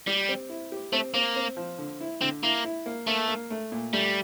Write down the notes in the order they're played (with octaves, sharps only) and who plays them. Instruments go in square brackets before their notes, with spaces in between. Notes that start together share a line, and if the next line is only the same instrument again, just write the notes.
[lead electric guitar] G3 [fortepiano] G4
[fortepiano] C4
E4
G4
[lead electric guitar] A3 [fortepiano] C4
[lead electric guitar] A#3 [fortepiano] C4
[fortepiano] C4
F3
D3
E4
[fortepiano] D3 [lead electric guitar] C4
[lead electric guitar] A#3 [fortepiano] E4
[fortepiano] E4
A#3
[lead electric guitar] A3 [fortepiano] A#3
[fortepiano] A#3
A3
A#2
[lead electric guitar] G3 [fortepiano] A3